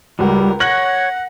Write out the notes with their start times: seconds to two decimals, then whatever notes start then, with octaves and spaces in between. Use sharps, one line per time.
0.19 C#2 G3 F#4 A#4
0.60 C#5 F#5 F#6 A#6 F#7